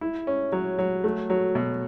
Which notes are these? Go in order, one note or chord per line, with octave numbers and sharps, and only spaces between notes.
E4
C#4
F#3
F#3
A3
F#3
B2